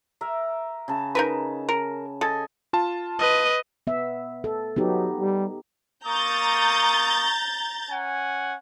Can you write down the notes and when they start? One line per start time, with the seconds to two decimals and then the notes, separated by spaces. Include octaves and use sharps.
0.21 A#4 E5
0.88 C#3 A5
1.15 D#4 A#4 B4
1.69 A#4
2.21 A4 D#5 G#5
2.73 F4 A5
3.19 B4 D#5
3.87 B3 E5
4.44 A4
4.76 F#3 B3 D#4 G4
5.19 G3
6.05 A#3 A#5 C#6 D#6 G6 A6
7.89 C#4 F#5 G#5